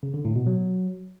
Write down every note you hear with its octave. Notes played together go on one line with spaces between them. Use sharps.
C#3
D3
A2
B2
F#3